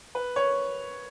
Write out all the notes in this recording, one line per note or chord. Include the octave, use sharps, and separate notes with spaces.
B4
C#5